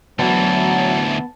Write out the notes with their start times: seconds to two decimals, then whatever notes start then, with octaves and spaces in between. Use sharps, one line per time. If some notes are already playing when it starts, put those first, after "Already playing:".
0.19 D2 E3 F#3 B3 A5